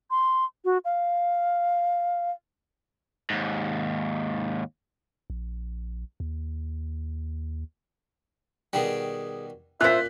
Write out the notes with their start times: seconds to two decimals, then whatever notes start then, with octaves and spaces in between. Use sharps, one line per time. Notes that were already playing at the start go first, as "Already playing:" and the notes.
0.11 C6
0.65 F#4
0.85 F5
3.30 D#2 G#2
5.30 A#1
6.20 D#2
8.73 B2 D#3 G3 G#4 G5
9.81 A#2 F4 C5 E5 F#6 B6